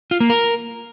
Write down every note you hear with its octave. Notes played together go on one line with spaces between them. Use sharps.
F4
A#3
A#4